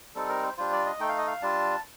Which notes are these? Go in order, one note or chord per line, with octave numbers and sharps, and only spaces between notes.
G3 C4 D#4 A4
A#4
C5
G3 D4 F4 C5
D5
D#5
A3 D#4 G5
F5
D#5
F5
G3 D4 F4 A5